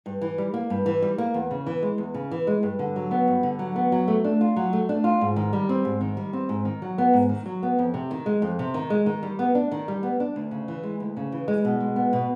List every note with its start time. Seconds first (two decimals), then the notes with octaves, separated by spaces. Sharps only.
0.06 G2
0.21 E3
0.38 G3
0.54 A#3
0.70 G2
0.86 E3
1.02 G3
1.18 A#3
1.34 E2
1.51 C#3
1.67 E3
1.83 G#3
1.98 E2
2.14 C#3
2.31 E3
2.47 G#3
2.63 G2
2.79 D3
2.96 F#3
3.11 B3
3.28 G2
3.43 D3
3.59 F#3
3.76 B3
3.92 F#3
4.08 A3
4.24 D4
4.41 F4
4.56 F#3
4.73 A3
4.89 D4
5.04 F4
5.21 G#2
5.36 D#3
5.53 G3
5.69 C4
5.85 G#2
6.01 D#3
6.17 G3
6.33 C4
6.49 G#2
6.65 D#3
6.82 F#3
6.98 B3
7.13 G#2
7.29 D#3
7.46 F#3
7.63 B3
7.79 F2
7.94 C3
8.11 D#3
8.26 G#3
8.42 F2
8.59 C3
8.74 D#3
8.90 G#3
9.06 D#3
9.23 G3
9.39 B3
9.55 D4
9.71 D#3
9.88 G3
10.03 B3
10.20 D4
10.36 D2
10.51 C#3
10.68 E3
10.83 G#3
11.00 D2
11.17 C#3
11.32 E3
11.48 G#3
11.65 B2
11.80 G#3
11.96 B3
12.13 B2